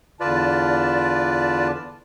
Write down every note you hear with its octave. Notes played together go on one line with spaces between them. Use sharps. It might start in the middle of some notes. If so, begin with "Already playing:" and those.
E2 D3 F4 B4 D5 A5